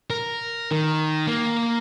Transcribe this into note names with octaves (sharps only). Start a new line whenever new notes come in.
A#4
D#3
A#3